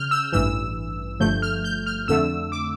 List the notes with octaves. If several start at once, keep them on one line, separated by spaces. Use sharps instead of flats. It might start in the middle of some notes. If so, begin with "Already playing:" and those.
Already playing: C#3 F6 G6
E6
A1 G2 E3 E6
G1 G2 F3 A3 G6
F6
G6
F6
F2 D3 A3 E6
D6